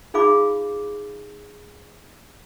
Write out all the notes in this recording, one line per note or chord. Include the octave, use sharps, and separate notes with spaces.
D#4 F4 G#4 F5 B5 D6